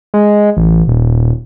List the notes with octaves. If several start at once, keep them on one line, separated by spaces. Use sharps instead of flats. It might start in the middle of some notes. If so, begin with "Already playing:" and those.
G#3
A1
D#1